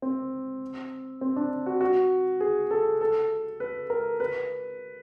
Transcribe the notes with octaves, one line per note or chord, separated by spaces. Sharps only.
C4
C4
D4
F#4
F#4
G#4
A4
A4
B4
A#4
B4